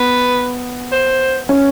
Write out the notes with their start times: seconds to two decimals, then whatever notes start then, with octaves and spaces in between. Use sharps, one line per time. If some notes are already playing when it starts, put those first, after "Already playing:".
Already playing: B3 B4
0.92 C5
1.49 C#4